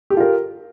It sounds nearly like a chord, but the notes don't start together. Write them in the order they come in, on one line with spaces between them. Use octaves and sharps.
G4 A4 F4 A#4